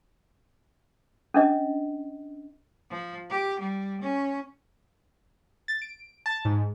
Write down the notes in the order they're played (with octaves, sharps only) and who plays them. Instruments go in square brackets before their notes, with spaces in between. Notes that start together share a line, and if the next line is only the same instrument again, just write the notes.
[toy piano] C#4 D4 D#5
[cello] F3
G4
G3
C#4
[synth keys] A6
D7
A5
G#2